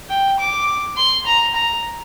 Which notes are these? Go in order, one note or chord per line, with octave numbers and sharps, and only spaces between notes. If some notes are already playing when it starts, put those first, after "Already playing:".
G5
D6
C6
A#5
A#5